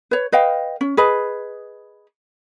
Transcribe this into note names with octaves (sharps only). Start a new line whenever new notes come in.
B4 C#5
B4 D#5 F5 G5
C#4
G#4 B4 D#5